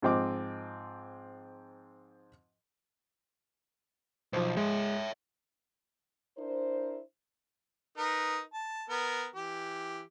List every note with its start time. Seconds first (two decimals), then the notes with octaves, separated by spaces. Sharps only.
0.02 G#2 F3 C4 D#5 D6
4.33 B1 F3 C5
4.57 G#3 C#5 E5
6.38 D4 E4 A#4 C5
7.98 D#4 A#4 B4
8.53 A5
8.89 B3 A#4
9.36 E3 G4